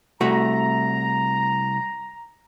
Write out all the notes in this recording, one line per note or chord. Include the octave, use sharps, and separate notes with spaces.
C2 A3 F#4 A#5